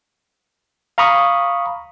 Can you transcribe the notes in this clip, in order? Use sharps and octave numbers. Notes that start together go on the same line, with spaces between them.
F5 A#5 B5 C#6 D#6